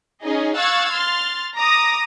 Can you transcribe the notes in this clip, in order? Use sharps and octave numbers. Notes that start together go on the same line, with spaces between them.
C#4 D#4 G#4 D#5
F5 C#6 E6 F#6 G#6 A6
C6 F6 A6
A#5 D6 D#6 A#6